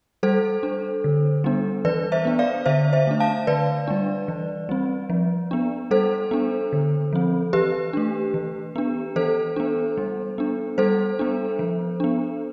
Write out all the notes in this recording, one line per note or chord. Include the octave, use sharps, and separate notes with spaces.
G3 A4 C5
D4
D3
G3 B3 D4
E3 B4 D5
C5 E5
B3 D4
D5 F5
D3 C5 E5
C5 E5
A3 D4
F5 A5
D3 B4 D5
G3 D4
E3
G3 C4
F3
B3 D4
G3 A4 C5
B3 D4
D3
F3 C4
E3 G4 B4
A3 D4
E3
B3 D4
E3 A4 C5
B3 D4
G3
B3 D4
G3 A4 C5
B3 D4
F3
B3 D4